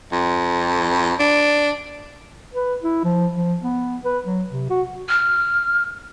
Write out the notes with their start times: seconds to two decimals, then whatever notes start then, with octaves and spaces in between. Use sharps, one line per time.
0.12 F2
1.20 D4
2.54 B4
2.83 E4
3.04 F3
3.35 F3
3.62 B3
4.04 B4
4.25 F#3
4.50 C3
4.70 F#4
5.09 F6